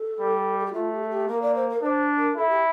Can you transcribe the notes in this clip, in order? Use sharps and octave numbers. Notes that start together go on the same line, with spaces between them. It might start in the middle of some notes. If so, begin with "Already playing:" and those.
Already playing: A4
G3
A4
G4
A3 F4
G4
A4
G4
A#3 A#4
D5
C5
A#4
D4 C5
A#4
E4 A4
G4